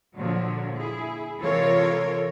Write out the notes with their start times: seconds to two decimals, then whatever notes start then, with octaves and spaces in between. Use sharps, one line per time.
0.17 A#2 D3 F3 F#3
0.80 E4 G#4
1.42 C3 E3 F4 A4 A#4 C#5